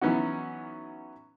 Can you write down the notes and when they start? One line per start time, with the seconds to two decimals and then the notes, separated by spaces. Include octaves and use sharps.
0.01 E3 F#3 B3 C#4 D#4 F#4